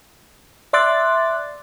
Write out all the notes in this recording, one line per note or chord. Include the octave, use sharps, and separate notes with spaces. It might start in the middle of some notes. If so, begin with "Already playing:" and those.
D5 E5 C6 D6 F#6 A6